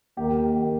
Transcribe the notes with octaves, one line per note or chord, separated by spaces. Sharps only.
D#2 D#3 A#3 G4
D#3 A#3